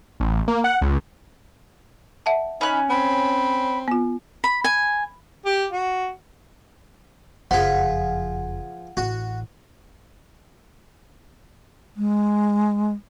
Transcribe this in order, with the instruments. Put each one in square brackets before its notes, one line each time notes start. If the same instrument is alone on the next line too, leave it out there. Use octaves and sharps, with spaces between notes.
[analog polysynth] A1
A#3
F#5
C#2
[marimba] E5 F#5 A5
[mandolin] C#4 F#6 [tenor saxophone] D#4 [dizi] B5
[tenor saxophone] C4 [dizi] B5
[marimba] B3 F4
[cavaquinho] B5
G#5
[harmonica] G4
F#4
[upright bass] F#1 F2 [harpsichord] F3 G#4 [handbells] F#5
[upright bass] A1 [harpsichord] F#4
[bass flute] G#3